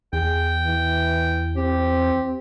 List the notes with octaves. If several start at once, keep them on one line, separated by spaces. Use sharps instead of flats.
E2 G#4 G5
E3
C4 G4